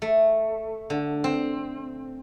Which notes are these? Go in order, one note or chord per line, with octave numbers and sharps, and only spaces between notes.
A3
D3
C4